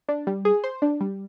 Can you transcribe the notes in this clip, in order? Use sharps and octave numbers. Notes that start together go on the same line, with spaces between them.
D4
G3
G#4
C5
D4
G3